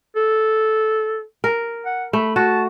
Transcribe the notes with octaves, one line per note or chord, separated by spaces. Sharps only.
A4
A#4
F#5
A3 B5
F#4 A5